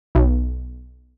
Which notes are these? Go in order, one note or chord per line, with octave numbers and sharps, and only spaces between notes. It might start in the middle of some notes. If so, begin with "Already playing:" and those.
B1